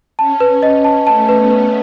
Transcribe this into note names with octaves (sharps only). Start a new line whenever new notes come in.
C#4 A5
B4
D#5
A5
A3 A5
B4
B3
B4